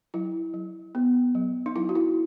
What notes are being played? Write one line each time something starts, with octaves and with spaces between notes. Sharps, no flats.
F#3 E4
F#3
B3
F#3
D#4
F#3 E4
F#4
E4